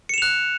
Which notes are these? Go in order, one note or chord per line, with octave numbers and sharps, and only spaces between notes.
F#6 C#7 E7 F7